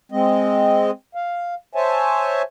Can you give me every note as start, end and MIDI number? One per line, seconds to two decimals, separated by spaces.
0.12 0.91 56
0.12 0.91 60
0.12 0.91 75
1.15 1.54 77
1.75 2.42 72
1.75 2.42 73
1.75 2.42 76
1.75 2.42 80
1.75 2.42 81